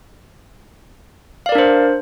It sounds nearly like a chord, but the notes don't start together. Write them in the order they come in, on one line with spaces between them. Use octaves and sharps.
F5 D5 A#4 D4 C5